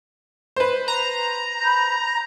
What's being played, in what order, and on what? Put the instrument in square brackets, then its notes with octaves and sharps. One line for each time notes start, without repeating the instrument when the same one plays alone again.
[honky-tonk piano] B4 C5
[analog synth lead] A#5
[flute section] B5 G6